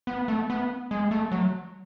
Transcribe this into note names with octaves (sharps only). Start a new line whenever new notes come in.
B3
A3
B3
G#3
A3
F#3